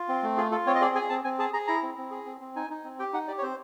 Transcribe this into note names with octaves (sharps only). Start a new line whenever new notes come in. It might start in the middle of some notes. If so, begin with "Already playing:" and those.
Already playing: F4
C4
A3
F4 G#4
F4 A4
C4 C#5
D#5
G#4 D5
G#4 G#5
C4 A5
C4 G#5
G#4 A5
G#4 A#5
E4 A#5
C4
C4
G#4
C4
C4
D#4 G#5
D#4
C4
G4 G5
D#4 F#5
G4 D5
C#5
C4 C5